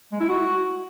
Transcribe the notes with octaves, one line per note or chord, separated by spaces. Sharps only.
G#3
E4
F#4